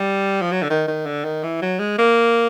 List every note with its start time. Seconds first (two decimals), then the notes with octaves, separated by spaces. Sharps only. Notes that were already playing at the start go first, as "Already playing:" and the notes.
Already playing: G3
0.41 F3
0.52 F#3
0.62 D3
0.70 D#3
0.88 D#3
1.06 D3
1.24 D#3
1.43 E3
1.62 F#3
1.79 G#3
1.98 A#3